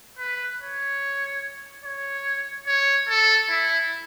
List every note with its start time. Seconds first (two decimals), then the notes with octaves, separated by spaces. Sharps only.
0.19 B4
0.61 C#5
1.84 C#5
2.67 C#5
3.08 A4
3.50 E4